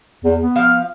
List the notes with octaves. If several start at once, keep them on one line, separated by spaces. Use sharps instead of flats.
E2
B3
F3 F5